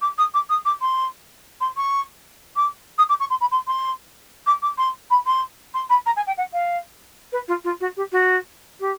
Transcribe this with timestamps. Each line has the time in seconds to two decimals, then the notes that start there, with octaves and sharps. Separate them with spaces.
0.01 D6
0.18 D#6
0.34 D6
0.49 D#6
0.65 D6
0.81 C6
1.60 C6
1.76 C#6
2.56 D6
2.98 D#6
3.09 D6
3.20 C#6
3.30 C6
3.40 B5
3.51 C6
3.67 C6
4.46 D6
4.62 D6
4.77 C6
5.10 B5
5.26 C6
5.74 C6
5.89 B5
6.06 A#5
6.16 G#5
6.26 G5
6.37 F#5
6.53 F5
7.32 B4
7.48 F4
7.64 F4
7.80 F#4
7.96 G4
8.12 F#4
8.80 G4